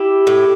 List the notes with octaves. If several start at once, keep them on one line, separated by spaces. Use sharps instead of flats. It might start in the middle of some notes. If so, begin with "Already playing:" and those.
Already playing: E4 G4
A2